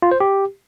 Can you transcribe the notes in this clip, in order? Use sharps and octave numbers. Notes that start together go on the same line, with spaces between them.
F4
C5
G4